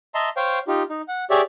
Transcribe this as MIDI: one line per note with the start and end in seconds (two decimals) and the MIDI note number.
0.15 0.29 75
0.15 0.29 76
0.15 0.29 81
0.15 0.29 82
0.15 0.29 84
0.37 0.59 72
0.37 0.59 73
0.37 0.59 77
0.37 0.59 79
0.68 0.83 63
0.68 0.83 65
0.68 0.83 67
0.90 1.02 63
1.08 1.25 78
1.30 1.41 67
1.30 1.41 68
1.30 1.41 73
1.30 1.41 74
1.30 1.41 76